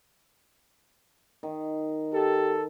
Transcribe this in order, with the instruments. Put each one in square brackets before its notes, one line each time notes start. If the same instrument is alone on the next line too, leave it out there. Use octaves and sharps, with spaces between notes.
[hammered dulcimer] D#3
[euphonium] G4 [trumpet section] A4